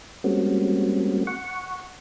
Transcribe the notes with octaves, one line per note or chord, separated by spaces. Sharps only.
G3 G#3 A#3 C4 C#4 F#4
F#5 C#6